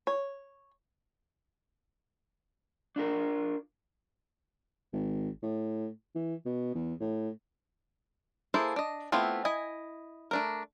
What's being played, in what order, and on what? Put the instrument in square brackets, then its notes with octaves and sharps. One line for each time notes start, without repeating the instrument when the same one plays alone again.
[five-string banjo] C#5
[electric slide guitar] D4 F4 A#4
[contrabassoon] G#1
A2
E3
B2
E2
A2
[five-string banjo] A#3 E4 G#4 A4 C5
D4 D#5
A3 B3 C4 E4 F4
E4 D#5 G#5
A3 D4 A#4